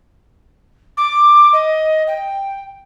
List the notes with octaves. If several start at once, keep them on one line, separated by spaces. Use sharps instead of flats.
D6
D#5
G5